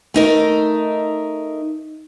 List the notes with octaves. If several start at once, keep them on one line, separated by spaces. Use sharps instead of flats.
A3 D#4 A#4